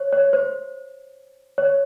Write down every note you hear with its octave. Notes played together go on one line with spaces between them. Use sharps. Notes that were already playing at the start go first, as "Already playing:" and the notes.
Already playing: C5 C#5
C#5
C5
C#5